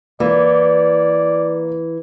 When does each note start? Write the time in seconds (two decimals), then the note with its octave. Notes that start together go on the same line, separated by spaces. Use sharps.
0.20 E3 A#3 D5